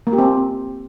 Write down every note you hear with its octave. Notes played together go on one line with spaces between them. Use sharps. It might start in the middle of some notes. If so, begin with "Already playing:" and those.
A#3
G4
C4